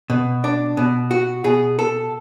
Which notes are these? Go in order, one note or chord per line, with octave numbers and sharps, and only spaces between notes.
B2
D4
B2
F#4
B2 G#4
A4